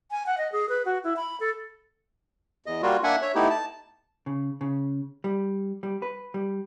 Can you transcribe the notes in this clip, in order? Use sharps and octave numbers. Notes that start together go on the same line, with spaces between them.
G#5
F#5
D#5
G#4
B4
F#4
E4
B5
A4
E2 D#5
G3 A#3 F4 F#4
A#3 D4 E5 F#5 G#5
C#5 E5
A3 B3 D#4 E4 G4
A5
C#3
C#3
G3
G3
B4
G3